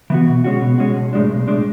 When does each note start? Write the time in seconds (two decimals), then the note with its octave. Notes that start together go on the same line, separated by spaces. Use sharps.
0.10 E3 B3 F#4
0.27 B2
0.44 G#3 C#4 F#4
0.62 B2
0.78 G#3 C#4 F#4
0.96 B1
1.13 A2 G#3 D4
1.30 B1
1.48 A2 G#3 D4